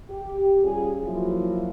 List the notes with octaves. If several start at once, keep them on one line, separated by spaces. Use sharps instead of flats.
G4
G3 C#4 F4 G#4
F3 F#3 A#3 E4 F#4